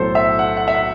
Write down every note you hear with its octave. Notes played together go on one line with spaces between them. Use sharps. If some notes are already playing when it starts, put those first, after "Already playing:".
Already playing: B1 A2 F#3 A4 C5
E5
F#5
F#5
E5
F#5